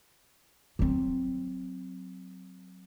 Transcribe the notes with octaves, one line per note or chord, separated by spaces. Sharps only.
F#3 C4